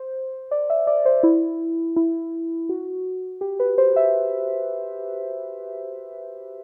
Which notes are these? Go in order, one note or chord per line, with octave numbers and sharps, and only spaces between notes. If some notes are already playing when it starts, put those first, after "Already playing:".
Already playing: C5
D5
E5
D5
C5
E4
E4
F#4
G4
B4
C5
E5